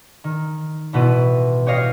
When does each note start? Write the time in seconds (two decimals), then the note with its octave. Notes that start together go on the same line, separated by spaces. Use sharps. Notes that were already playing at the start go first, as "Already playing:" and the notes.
0.24 D#3
0.93 A1 B2 E4 D#7
1.67 G4 C#5 D#5 F5